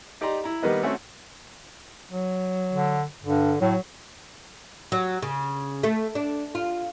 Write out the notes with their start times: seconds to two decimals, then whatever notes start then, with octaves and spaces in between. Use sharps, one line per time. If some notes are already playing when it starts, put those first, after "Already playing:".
0.21 D#4 G4 D5 D#5 A#5 C6
0.44 E4 A#5
0.63 D#3 G3 A#3 B3 B4 D#5
0.83 A3 C4 C#4 F#4 E5 F#5
2.11 F#3
2.72 D3
3.24 G2 D3
3.60 A2 F#3
4.92 F#3
5.22 C#3
5.83 A3
6.15 D4
6.55 F4